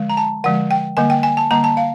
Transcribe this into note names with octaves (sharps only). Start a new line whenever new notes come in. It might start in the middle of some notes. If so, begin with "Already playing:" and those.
Already playing: D3 F3 G#3
A#5
A5
D3 F3 G#3 F#5
G5
D3 G3 A#3 G#5
G5
G#5
A5
D3 G3 A#3 A#5
A5
F5